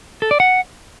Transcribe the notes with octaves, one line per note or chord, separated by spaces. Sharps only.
A4
D5
F#5